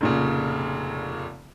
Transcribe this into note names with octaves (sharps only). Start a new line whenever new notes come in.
F1 A#2 C#3